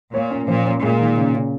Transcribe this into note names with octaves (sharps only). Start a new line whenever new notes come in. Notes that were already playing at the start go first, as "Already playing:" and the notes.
A#2 C#5
C#4
A#2 F3
C#4
A#2 G#3
D#3
C#3
C#3